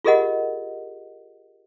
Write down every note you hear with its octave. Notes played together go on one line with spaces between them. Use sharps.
F4 G4 G#4 A#4 D#5 F#5